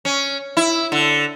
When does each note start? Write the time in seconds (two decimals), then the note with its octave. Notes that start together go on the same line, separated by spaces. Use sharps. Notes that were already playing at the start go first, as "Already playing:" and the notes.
0.05 C#4
0.57 E4
0.92 D3